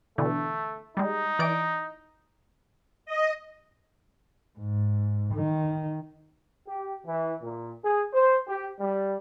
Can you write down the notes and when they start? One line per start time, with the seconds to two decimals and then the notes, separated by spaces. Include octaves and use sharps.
0.18 B2 D3 E3 A3
0.97 G3 G#3 D#4
1.39 E3 D5 D7
3.06 D#5
4.59 G#2
5.34 D#3
6.66 G4
7.05 E3
7.42 A#2
7.82 G#4
8.13 C5
8.47 G4
8.80 G3